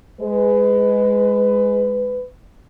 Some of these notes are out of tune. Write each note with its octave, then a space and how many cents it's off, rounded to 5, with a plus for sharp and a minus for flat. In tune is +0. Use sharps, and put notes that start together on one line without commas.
G#3 +0 B4 +20